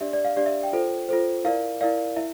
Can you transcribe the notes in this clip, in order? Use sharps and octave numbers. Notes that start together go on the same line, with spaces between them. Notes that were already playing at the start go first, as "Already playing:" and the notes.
D4 G4 D5 E5
D5
F5
D4 G4 D5
E5
G5
F4 A4 C5
F4 A4 C5
E4 A#4 D5 F5
E4 A#4 D5 F5
E4 E5